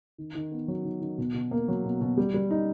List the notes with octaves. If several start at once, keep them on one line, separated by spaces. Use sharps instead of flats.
D#3
D#3
B3
F#3
D#3
D#3
B2
B2
A#3
F#3
B2
B2
G3
G3
D#4